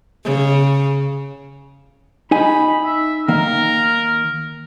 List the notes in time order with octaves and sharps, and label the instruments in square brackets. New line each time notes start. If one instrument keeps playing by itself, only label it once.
[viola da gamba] C#3
[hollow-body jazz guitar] D#4 G#5 [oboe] B5
[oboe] E5
[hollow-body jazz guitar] D#3 A#3 [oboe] A#4